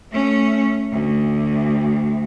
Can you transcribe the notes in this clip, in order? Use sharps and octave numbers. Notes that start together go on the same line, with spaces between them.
A3 C#4
D2